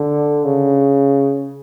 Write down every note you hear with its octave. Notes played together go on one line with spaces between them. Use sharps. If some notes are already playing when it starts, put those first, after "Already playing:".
Already playing: D3
C#3